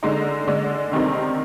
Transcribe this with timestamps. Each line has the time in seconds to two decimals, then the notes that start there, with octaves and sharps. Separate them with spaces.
0.03 D3 G#3 D#4
0.47 D3 G#3 D4
0.92 C3 D#3 G3 C4 D#4